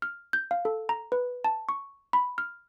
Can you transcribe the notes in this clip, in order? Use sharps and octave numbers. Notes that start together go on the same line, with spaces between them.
F6
G6
F5
A4
A#5
B4
A5
C#6
B5
F6